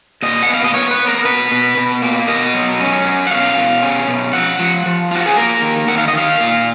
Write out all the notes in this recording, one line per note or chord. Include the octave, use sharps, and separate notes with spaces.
A#2 D#5
F#5
B3
F5
D#5
B3 C#5
B4
B3
A#4
B2 B4
B2
B2
A#3
B2 D#5
F#3
C#4
F#3
F#5
B2 F5
B2
C#4
B2
F3 F#5
F3
F3
F4 F#4
G#4
A#3 A#4
D#3
D#3 F#5
F5
D#5
D#3 F5
A#2